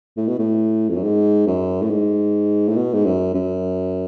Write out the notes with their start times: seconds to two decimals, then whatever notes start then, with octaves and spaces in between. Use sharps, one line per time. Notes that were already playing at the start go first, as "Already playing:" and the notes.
0.17 A2
0.28 B2
0.39 A2
0.89 F2
0.96 F#2
1.03 G#2
1.47 F#2
1.82 A2
1.90 G#2
2.68 A2
2.76 B2
2.93 G#2
3.05 F#2
3.34 F#2